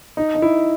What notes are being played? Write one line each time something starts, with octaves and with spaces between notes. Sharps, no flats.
D#4
D#4
E4